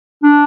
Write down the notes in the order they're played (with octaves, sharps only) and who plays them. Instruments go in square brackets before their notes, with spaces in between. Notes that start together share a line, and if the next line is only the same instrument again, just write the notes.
[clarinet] D4